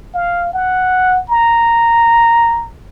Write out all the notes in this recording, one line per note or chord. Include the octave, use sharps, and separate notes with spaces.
F5
F#5
A#5